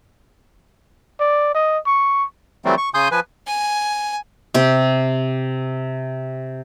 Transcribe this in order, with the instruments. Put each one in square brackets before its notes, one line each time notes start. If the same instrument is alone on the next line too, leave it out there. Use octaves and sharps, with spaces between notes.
[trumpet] D5
D#5
C#6
[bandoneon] E3 F#3 G3 A3 C4
C#6
C#3 G#5 C6 D#6 G6
F3 B4 G#5
[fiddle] G#5
[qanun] C3 G4